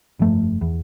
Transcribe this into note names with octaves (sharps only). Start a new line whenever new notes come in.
F1 G2 F3 A3
E2